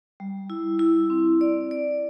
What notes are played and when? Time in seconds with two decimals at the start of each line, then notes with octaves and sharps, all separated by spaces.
0.20 G3
0.50 E4
0.79 E4
1.10 C4
1.41 D5
1.71 D5